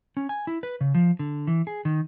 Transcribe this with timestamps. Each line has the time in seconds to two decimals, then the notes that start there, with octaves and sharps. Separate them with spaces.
0.17 C#4
0.29 G#5
0.47 E4
0.63 B4
0.81 C#3
0.94 F3
1.19 D3
1.47 E3
1.67 G#4
1.85 D#3